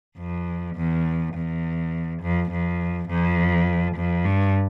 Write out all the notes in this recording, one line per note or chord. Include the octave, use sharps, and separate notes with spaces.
F2
E2
E2
F2
F2
F2
F2
G2